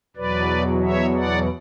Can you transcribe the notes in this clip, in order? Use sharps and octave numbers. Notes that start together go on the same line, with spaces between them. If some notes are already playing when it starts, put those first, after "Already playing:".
E2 B2 F#3 B4 D5
C#5 E5
D5 F#5